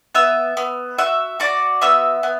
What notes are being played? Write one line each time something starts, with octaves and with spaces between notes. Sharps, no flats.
B3 E5 E6
B3
F#4 E5 E6
F#4 D5 D6
B3 E5 E6
B3